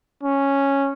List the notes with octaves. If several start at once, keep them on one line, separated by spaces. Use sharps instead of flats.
C#4